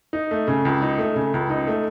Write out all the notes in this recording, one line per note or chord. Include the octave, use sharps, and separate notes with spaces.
D#4
A3
C#3
C#2
D#4
A3
C#3
C#2
D#4
A3